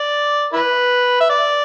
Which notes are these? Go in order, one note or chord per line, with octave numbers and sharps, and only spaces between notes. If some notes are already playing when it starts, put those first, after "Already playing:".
Already playing: D5
E4 B4
E5
D5